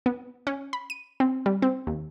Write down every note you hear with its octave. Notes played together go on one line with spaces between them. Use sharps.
B3
C#4
B5
D#7
C4
G3
C4
D#2